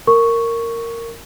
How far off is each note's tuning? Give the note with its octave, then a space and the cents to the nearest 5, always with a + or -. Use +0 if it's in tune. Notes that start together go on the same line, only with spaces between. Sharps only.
A#4 -15 C#6 +0